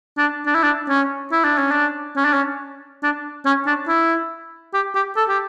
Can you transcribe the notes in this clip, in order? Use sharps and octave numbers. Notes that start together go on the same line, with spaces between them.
D4
D4
E4
D4
C#4
E4
D4
C#4
D4
C#4
D4
C#4
D4
C#4
D4
E4
G4
G4
A4
G4